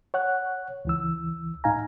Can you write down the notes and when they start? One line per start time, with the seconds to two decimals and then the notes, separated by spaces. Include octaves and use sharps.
0.14 C#5 F#5 F#6
0.85 C#2 E3 E6
1.64 A2 D#4 F5 G#5 A#5